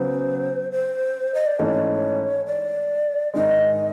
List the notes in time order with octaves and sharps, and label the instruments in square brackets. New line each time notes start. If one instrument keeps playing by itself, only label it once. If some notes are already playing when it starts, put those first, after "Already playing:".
Already playing: [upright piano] C#3 F#3 B3 [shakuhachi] C5
[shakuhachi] C5
D#5
D5
[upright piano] G#2 E3 A3 C#4 [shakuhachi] C#5
[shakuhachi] D5
[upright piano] G#2 D#3 G#3 [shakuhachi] D#5